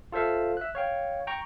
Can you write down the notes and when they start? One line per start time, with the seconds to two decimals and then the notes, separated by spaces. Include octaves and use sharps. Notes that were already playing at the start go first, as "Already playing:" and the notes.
0.12 F4 A4 C5 E5 F5
0.57 E5 F#6
0.75 C#5 F5 G5
1.27 G5 A#5 C#6